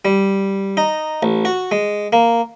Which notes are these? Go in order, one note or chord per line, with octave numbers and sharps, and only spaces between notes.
G3
D#4
A1
F#4
G#3
A#3